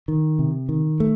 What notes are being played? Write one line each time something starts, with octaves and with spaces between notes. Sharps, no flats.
D#3
C3
D#3
A3